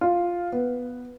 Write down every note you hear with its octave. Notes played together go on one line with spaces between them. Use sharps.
F4
B3